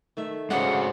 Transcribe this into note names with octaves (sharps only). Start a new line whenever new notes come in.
D#3 A3 E5
C#3 G#3 D4 D#4 F#4 G4 C5 F#5